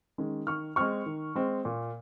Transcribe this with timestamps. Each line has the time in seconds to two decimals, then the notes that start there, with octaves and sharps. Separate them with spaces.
0.18 D#3 G#3 C#4
0.47 D#3 C#6 F6
0.76 G#3 C4 C#6 F6
1.06 D#3
1.35 G#3 C4
1.65 A#2